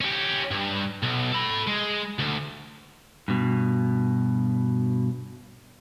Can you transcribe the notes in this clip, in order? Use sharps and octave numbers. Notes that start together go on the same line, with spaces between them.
C#4 G4
G2
B1
A4 B5
G#3
D2
G2 B2